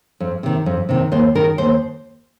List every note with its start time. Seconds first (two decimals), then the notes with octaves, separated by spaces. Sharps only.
0.20 F2
0.43 C3 D#3
0.66 F2
0.89 C3 D#3
1.12 D#2 C5
1.35 D#3 A#4
1.58 D#2 C5